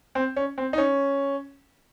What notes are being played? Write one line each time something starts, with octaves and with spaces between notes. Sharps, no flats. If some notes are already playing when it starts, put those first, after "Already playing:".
C4
C#4
C4
D#4
C#4